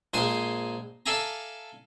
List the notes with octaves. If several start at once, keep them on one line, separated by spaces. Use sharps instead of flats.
A#1 G#3 C5 G#5 C6
A4 D5 E5 F5 G#5 A#5